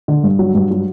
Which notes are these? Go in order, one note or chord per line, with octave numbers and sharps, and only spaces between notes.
D3
G2
F#3
G2
F#3